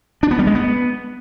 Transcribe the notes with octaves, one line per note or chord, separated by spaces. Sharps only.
D4
B3
G3
G#3
B3